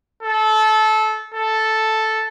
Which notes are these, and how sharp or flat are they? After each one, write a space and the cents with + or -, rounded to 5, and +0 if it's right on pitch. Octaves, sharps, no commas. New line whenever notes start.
A4 -20
A4 -5